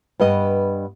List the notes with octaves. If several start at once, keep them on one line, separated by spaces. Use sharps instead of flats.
G2 B3 D#5